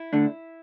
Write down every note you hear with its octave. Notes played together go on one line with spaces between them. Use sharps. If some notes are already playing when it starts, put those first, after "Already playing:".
Already playing: E4
D3 A3 D4